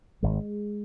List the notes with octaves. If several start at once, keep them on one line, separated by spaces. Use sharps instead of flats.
G#1 G#3